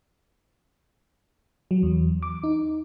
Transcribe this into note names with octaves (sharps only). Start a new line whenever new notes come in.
F#3
E2
D6
D#4